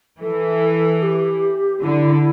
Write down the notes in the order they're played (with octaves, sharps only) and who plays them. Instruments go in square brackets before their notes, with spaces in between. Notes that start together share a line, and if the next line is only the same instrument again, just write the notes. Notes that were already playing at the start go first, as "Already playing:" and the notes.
[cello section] E3 [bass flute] A4
[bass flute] G4
[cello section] D3 [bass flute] E4